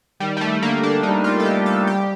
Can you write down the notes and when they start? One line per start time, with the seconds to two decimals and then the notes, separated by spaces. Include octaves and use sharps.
0.20 D#3 G3
0.37 G3
0.41 A3
0.61 D3 A#3
0.83 D4
1.03 G3 D#4
1.24 F4
1.40 A4
1.45 G4
1.66 A4
1.87 G4